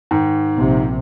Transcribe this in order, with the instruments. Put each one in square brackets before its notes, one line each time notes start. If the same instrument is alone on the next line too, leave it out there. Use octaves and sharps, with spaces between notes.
[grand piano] G#2 D#3
[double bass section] A#1 C3